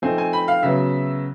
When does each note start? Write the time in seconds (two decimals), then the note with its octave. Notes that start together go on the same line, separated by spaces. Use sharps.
0.02 F3 A3 C4 D#4 G#5
0.18 G#5
0.33 B5
0.48 F5
0.63 C#3 F#3 B3 E5